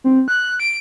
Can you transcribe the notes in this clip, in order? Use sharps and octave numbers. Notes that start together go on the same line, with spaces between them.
C4
F#6
D7